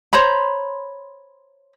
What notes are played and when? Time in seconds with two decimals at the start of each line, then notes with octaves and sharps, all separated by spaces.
0.13 C5 C#5 A#5 B5